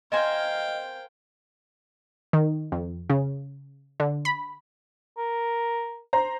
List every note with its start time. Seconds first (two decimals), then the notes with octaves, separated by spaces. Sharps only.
0.12 A#4 C5 D#5 F5 G5 G#5
2.33 D#3
2.72 F2
3.10 C#3
4.00 D3
4.25 B5
5.18 A#4
6.13 C5 A#5